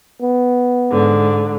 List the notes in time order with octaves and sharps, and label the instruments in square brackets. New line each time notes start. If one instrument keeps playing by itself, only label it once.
[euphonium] B3
[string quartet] G#2 D3